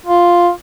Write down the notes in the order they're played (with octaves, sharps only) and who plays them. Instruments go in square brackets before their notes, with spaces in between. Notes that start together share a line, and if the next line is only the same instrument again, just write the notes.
[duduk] F4